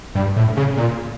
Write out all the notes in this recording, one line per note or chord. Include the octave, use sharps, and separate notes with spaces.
G2
A2
C#3
A#2